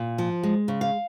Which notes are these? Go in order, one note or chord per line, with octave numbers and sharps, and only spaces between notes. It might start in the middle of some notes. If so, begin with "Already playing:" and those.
Already playing: A#2
F3
G#3
C#3
F5